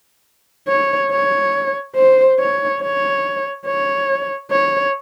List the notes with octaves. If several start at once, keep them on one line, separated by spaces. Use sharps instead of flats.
C#5
C#5
C5
C#5
C#5
C#5
C#5